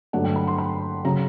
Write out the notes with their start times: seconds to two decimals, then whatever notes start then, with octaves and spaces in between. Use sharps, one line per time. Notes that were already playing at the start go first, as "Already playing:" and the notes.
0.13 G2 D3 F#3 A3 D4 F#5
0.24 G5
0.36 B5
0.47 C6
0.58 B5
1.04 C#3 F#3 A#5